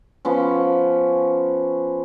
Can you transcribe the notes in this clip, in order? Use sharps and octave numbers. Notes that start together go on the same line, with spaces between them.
F3 B3 C#4